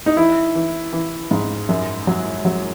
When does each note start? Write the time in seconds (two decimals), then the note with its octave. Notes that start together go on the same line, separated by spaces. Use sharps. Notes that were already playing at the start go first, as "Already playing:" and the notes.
0.06 D#4
0.16 E3 E4
0.55 E3
0.93 E3
1.31 G#2
1.69 F#2
2.07 F#3
2.45 F#3